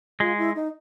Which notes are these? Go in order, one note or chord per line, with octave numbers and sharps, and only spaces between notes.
G#3 F4
E4
D#4